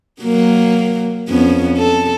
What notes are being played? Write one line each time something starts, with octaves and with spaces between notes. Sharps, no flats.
F#3 A#3
F2 B3 C#4
A4